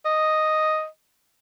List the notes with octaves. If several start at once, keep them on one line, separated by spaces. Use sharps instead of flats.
D#5